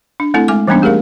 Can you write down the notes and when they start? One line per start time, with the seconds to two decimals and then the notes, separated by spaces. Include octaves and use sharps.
0.20 D4
0.34 A3 C4 E4 A4
0.48 G#3 G#5 D6
0.68 E3 G3 A#3 B3 C#4 D4
0.82 A3 G4 G#4 A#4 F5